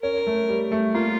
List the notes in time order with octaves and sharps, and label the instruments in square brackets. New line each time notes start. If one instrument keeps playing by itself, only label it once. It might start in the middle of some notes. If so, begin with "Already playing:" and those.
[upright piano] C#4 [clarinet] A#4
[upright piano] A3
G3
A3
[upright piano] A#3 [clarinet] F4